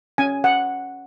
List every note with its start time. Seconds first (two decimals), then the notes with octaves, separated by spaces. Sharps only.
0.18 C#4 G#5
0.44 F#5